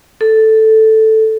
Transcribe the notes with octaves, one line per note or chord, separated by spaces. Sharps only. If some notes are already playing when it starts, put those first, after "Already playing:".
A4